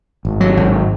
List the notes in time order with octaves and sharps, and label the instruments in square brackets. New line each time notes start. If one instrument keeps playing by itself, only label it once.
[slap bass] G#1
F#3
G#1